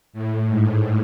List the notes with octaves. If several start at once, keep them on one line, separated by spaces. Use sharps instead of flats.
A2
G#2